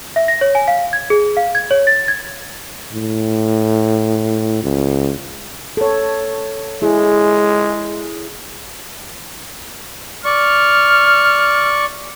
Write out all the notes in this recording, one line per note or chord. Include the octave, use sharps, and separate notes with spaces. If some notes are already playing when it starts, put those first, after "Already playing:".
E5
A#6
C#5
G#5
F5
G#6
G#4
F5
G#6
C#5
A6
G#6
A2
C#2
A4 C#5
G#3 E4 G#4
D5 C#6 F6